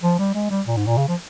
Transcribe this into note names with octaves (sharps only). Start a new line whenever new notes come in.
F3
G3
G#3
G3
A#2
G#2
A#2
C#3
F3